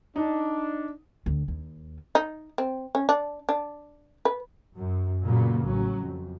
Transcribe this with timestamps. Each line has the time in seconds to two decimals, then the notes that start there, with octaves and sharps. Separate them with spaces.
0.16 D4 D#4
1.26 D2
1.48 D#2
2.15 D#4
2.58 C4
2.95 C#4
3.09 D4
3.49 D4
4.25 B4
4.76 F#2
5.23 A#2 C#3 F#3 A#3 B3
5.62 A1 F#3 C#4
5.96 F2